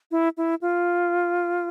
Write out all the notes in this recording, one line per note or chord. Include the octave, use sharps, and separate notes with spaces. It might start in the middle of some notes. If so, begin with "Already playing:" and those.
E4
E4
F4